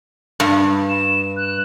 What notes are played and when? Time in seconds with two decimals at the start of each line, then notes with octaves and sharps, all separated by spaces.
0.40 G2
0.89 E7
1.37 F#6